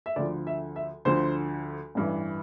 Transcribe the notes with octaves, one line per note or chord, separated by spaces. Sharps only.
E5
D2 D3 F3 D5
E5
E5
D2 D3 F3 C5
A1 G2 E3